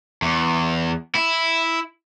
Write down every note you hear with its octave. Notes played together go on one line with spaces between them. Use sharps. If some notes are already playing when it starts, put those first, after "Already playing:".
E2
E4